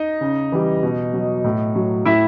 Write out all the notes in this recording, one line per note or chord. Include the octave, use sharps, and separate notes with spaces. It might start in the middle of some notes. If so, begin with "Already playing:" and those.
Already playing: D#4 D#5
C#3
E3 G3
B2
F#3
A2
F#3
A2 E4 E5